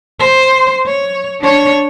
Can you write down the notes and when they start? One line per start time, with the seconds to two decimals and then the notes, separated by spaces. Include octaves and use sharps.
0.19 C5
0.86 C#5
1.40 D4 C#5